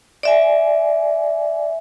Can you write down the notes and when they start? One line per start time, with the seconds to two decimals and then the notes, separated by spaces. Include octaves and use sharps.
0.23 D5 E5 G#5